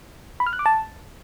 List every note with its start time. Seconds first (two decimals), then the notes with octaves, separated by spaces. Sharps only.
0.40 B5
0.46 F6
0.53 F#6
0.59 D6
0.66 A5